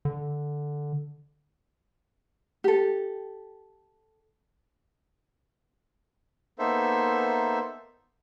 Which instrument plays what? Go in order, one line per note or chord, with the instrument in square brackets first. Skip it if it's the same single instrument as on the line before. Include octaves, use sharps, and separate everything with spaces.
[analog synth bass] D3
[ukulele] G4 A4
[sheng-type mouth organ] A#3 B3 D#4 A4 C5 E5